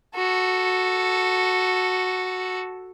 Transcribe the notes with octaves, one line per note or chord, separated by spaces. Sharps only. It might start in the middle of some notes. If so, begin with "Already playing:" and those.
F#4 A4